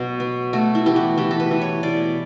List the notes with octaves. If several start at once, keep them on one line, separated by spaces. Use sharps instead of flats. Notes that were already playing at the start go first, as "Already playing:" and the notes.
Already playing: B2 F#3
B3
A3 F#4
E4
E3 G4
F#4
E3 G4
A4
B4
E3
C#5
B2 D5